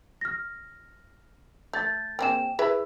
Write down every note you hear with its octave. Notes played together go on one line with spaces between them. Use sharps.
F6 A#6
A3 G6 A6
A#3 C4 G#4 G5 E7
E4 G#4 B4 E5